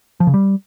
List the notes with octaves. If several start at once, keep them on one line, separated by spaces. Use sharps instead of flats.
F3
C#3
G3